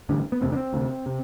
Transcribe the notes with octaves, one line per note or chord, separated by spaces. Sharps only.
A1 G2 D3
B3
E1 D2 C3 C4
D4
C4
D2 C3
C3